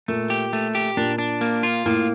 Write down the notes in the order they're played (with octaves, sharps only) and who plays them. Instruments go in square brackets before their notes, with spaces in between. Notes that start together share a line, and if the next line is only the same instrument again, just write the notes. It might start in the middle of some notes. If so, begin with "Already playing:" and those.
[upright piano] A#2 [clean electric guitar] A3
[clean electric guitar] G4
A3
G4
[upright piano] A#2 [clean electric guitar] D4
[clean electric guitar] D4
A#3
F4
[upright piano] A2 [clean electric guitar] A#3